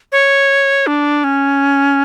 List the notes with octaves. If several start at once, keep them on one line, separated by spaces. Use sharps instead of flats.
C#5
D4
C#4